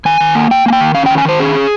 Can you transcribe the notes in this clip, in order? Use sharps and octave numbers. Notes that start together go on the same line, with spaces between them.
D#3 G#5
D#3
A#3
A#3 G5
A#3 G#5
G5
D#3
C#4 F5
D#3 G5
G#5
D#3 C5
C#4 G#4
C#4